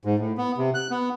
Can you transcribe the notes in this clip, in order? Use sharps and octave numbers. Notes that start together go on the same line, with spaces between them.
G#2
A2
B3
C3
F#6
B3